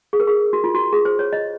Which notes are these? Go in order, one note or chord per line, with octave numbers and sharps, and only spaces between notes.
G#4
A#4
G#4
F#4
F4
F#4
G#4
C5
C#5
D#5